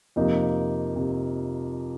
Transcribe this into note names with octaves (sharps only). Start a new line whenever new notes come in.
F2 C3 F3 A#3 D#4
C3